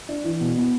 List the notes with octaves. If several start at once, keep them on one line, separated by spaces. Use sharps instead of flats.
D4
E3
B2
B3